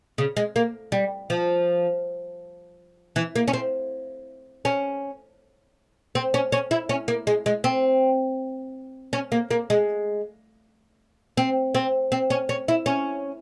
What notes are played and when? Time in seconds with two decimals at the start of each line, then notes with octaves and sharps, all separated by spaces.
0.18 C#3
0.37 G#3
0.56 A#3
0.92 G3
1.30 F3
3.16 E3
3.36 A#3
3.48 C#4
3.53 C4
4.65 C#4
6.15 C4
6.34 C#4
6.52 C#4
6.71 E4
6.89 C#4
7.08 A#3
7.27 G#3
7.46 G#3
7.64 C4
9.13 C#4
9.32 A#3
9.51 A#3
9.70 G#3
11.37 C4
11.75 C4
12.12 C4
12.30 C#4
12.49 C#4
12.68 E4
12.86 C#4